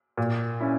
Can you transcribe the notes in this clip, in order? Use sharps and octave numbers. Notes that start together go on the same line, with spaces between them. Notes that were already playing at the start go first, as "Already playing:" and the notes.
A#2
C#4 E4